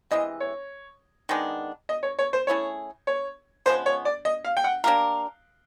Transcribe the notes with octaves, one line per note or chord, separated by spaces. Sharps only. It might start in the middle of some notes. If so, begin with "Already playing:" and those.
C3 E3 G#3 D#5
C#5
D#3 G#3 B3 D4
D#5
C#5
C#5
C5
A3 C#4 E4 G#4 C#5
C#5
C#3 F3 G#3 B3 C5
C#5
D5
D#5
F5
G5
F#5
A#3 D4 G4 A#4 F5